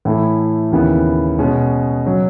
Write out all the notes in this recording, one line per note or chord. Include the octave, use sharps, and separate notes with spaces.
A2 E3 A3 E4
D#2 C#3 E3 B3
B2 G#3 C#4
C#3 F#3 C#4